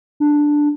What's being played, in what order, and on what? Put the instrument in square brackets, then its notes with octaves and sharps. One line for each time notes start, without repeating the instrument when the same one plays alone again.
[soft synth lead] D4